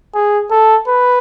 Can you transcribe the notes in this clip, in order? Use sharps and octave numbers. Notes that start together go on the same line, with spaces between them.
G#4
A4
B4